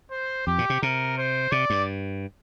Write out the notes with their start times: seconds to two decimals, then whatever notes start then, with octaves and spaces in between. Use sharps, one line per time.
0.11 C5
0.47 F2 G4
0.58 A#2
0.70 C3
0.82 C3 A#4
1.18 C5
1.52 C3 D5
1.70 G2